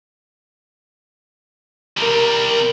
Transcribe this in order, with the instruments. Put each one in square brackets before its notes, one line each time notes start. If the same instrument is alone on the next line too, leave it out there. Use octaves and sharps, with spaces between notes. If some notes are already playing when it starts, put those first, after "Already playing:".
[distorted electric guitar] C3 G3 [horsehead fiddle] A#4